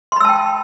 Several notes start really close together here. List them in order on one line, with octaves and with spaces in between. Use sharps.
C6 B5 E6 A5 G5